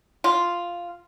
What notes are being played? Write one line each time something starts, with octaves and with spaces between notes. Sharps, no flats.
F4